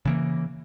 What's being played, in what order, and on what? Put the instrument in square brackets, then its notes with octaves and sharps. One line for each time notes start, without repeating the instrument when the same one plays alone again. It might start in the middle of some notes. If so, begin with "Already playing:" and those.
[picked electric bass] C#3 E3 A#3